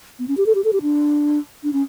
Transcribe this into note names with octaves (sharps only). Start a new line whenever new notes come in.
B3
C#4
G4
A4
G4
A4
G4
D4
D4
C#4